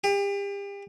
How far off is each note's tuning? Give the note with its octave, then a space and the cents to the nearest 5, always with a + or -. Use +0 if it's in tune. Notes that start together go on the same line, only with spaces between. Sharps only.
G4 +35